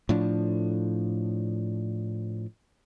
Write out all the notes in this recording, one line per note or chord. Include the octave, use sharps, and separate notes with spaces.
A2 F3 D4